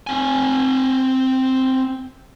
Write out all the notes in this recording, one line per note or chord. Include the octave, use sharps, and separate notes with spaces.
C4 G#5